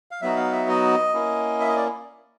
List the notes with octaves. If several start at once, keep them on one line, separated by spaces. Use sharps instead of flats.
F5
F#3 B3 D#4 F#4 E5
F5
E5
D#5
A#3 C#4 E4
E5
D#5
D5